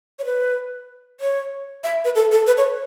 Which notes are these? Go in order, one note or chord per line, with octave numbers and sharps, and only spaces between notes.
C#5
B4
C#5
E5
B4
A4
A4
B4
C#5